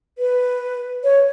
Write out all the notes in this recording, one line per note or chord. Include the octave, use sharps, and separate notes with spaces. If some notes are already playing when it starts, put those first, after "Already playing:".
B4
C#5